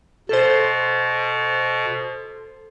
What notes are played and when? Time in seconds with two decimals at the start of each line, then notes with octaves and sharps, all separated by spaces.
0.29 B2 A4 C5